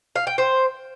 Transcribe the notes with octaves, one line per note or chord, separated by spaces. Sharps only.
F5
G5
C5